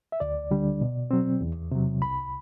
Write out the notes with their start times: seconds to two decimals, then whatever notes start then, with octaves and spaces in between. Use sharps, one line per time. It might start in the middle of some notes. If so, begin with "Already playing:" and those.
0.12 E5
0.20 D2 D5
0.51 D3 G3 D4
0.81 B2
1.11 F#3 C4
1.41 E2
1.71 C3 F#3
2.02 C2 B5